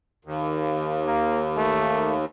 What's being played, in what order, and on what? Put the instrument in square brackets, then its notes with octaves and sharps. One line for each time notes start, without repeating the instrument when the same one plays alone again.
[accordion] D#2
[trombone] A#3
A3